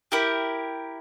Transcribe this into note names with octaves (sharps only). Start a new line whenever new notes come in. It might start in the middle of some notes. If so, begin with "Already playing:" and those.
E4 G4 A#4